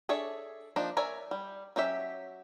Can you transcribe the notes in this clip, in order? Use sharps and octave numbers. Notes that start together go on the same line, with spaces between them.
D4 G#4 A4 C#5 E5
F3 A#3 D4 D#4
A#4 C#5 D5 E5 G#5
G3
F#3 C#4 G4 E5